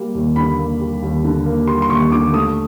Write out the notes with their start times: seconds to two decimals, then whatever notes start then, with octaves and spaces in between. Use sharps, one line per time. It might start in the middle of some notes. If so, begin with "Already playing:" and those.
Already playing: G3 A#3
0.15 D#2
0.36 D3 B5
0.58 A#3
0.80 G3
1.02 D#2
1.24 D3
1.46 A#3
1.67 G3 C6
1.82 C6
1.89 D#2 C#6
2.12 D3 D6
2.33 A3 D#6